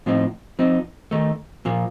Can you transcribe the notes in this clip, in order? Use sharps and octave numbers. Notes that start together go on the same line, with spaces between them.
A2 F3 C4 D#4
F3 C4 D#4
D#3 A3 D#4
A#2 F3 A#3